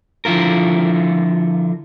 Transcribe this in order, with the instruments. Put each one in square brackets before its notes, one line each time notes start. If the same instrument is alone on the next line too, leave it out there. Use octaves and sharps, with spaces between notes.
[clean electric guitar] D3 F3 E4 F4 A#4